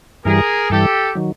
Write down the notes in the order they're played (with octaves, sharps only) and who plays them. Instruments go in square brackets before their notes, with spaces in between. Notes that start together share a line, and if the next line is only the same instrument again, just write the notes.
[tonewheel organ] G2 E3 G3 [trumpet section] G#4 A#4
[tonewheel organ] G2 E3 G3 [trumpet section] G4 A4
[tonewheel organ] D#3 F#3